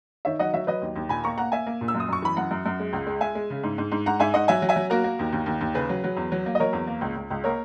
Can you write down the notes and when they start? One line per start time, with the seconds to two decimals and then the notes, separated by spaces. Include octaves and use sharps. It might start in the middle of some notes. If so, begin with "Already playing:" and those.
0.25 D#3 C#5 E5
0.39 F#3 D#5 F#5
0.53 F#3 C#5 E5
0.67 F#3 B4 D#5
0.82 D#2
0.96 D#2
1.09 A#2 G#5 B5
1.24 A#3 A#5 C#6
1.38 A#3 F#5 A#5
1.52 A#3 E5 G#5
1.67 A#3
1.81 A#2
1.88 E6
1.95 F#2
2.00 D#6
2.09 F#2 C#6
2.22 E3 B5
2.36 F#2 F#5 A#5
2.51 F#2
2.66 F#2
2.80 G#3
2.93 C#2
3.07 G#3
3.21 G#3 E5 G#5
3.35 G#3
3.50 C#3
3.63 G#2
3.78 G#2
3.91 G#2
4.06 G#2 F#5 A#5
4.19 G#2 E5 G#5
4.33 G#2 D#5 F#5
4.48 F#3 E5 G#5
4.62 F#3
4.69 E5 G#5
4.76 F#3
4.90 A#3 F#4 A#4
5.04 A#3
5.19 D#2
5.33 D#2
5.46 D#2
5.61 D#2
5.75 C#3 G#4 B4
5.89 F#3
6.04 F#3
6.17 E2
6.32 F#3
6.46 A#3
6.55 D#5
6.60 F#3 A#4 C#5
6.73 E2
6.87 A#3
7.01 C#2
7.16 C#2
7.30 C#2
7.44 A#3 A#4 C#5